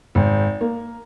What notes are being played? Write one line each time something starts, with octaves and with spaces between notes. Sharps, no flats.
G#1
A#3